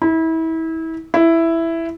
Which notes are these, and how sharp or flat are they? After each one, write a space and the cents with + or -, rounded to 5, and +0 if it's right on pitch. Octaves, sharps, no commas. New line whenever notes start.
E4 -30
E4 +5